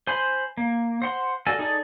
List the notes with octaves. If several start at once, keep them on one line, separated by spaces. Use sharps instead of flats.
C5 G#5 B5 C6
A#3
C5 F#5 C6
F#4 A4 A#4 D5 G#5
D#4 G#4 A4 D5